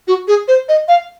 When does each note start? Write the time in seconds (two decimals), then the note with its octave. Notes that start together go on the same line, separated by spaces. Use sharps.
0.08 F#4
0.28 G#4
0.48 C5
0.69 D#5
0.88 F5